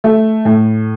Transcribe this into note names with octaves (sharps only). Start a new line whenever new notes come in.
A3
A2